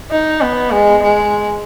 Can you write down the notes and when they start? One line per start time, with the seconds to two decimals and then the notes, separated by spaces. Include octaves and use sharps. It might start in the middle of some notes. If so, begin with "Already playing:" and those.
0.11 D#4
0.41 B3
0.72 G#3
1.03 G#3